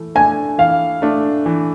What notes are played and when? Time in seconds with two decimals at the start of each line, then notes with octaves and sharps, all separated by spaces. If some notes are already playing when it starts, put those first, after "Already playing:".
Already playing: E3 A3
0.15 A3 D4 G#5
0.58 E3 F5
1.02 A3 D4
1.46 E3